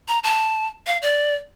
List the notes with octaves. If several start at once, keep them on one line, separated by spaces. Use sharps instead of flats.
A#5
A5
F5
D5